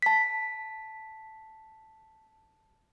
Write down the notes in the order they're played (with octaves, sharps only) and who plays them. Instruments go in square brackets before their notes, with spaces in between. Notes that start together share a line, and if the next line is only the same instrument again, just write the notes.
[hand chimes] A5 B6